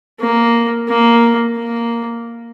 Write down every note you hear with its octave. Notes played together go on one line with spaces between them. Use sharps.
A#3
A#3
A#3